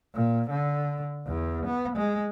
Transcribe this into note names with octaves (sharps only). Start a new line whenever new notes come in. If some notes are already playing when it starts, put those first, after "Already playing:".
A#2
D3
E2
B3
G#3